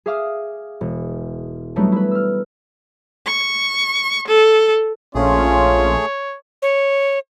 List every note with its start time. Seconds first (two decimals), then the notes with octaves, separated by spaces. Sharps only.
0.06 G#4 E5 F5 D6 D#6 F6
0.81 E1
1.76 F#3 G3 A3 B3 D4 D#4
1.92 E4 B4
2.11 E6 F6
3.26 C#6
4.27 A4
5.15 A#1 A3 C#4 F4 G#4 C#5
6.62 C#5